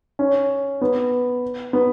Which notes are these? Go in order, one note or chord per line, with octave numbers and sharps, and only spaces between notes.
C#4
B3
B3